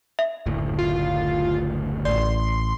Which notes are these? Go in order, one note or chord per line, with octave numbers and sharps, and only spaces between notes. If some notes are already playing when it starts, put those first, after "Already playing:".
E5
F#1 D2 A2
F4
A1 D5 C6